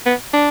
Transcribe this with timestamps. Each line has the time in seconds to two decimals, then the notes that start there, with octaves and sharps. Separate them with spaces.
0.06 B3
0.34 D4